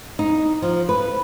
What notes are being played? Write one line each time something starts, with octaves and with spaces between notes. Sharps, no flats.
D#4
F3
B4